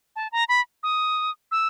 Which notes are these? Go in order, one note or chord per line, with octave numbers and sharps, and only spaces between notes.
A5
A#5
B5
D#6
E6